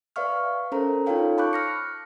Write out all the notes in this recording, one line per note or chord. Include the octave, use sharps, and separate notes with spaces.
B4 D5 E5 F5 C#6 F6
C#4 A4 A#4 C5 A#5
D#4 F4 A4 C#5 F5 G5
A5 B5 C#6 D6 F#6 G6
F6 A#6 C#7